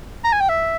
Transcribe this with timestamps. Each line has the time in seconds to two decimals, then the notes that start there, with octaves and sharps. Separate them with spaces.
0.24 A#5
0.32 G#5
0.41 G5
0.49 E5